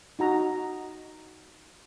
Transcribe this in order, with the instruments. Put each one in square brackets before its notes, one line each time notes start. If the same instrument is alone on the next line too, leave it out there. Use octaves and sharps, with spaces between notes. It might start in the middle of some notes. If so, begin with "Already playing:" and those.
[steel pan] D#4 F#4 A#5